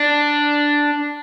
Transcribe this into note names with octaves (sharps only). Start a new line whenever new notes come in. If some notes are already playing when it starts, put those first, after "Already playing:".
Already playing: D4